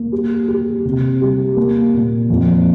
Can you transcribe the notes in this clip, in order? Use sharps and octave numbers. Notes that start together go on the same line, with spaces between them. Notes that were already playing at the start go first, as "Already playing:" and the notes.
Already playing: A#3
G4
G4
C3
G3
A#3
A#2
F2